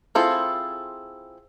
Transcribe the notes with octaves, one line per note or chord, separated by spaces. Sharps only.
C4 E4 F4 G#4 A4